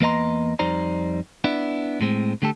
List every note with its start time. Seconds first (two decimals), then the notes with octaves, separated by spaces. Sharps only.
0.01 E2 A#3 B4 D#5 A#5 C6
0.59 F2 G3 D#4 C5 D5 A#5
1.44 B3 D4 E4
2.01 A2 G#3 C4
2.42 D3 A3 G4 A4